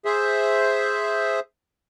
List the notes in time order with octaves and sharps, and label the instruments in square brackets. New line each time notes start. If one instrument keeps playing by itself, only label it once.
[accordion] G#4 C5 E5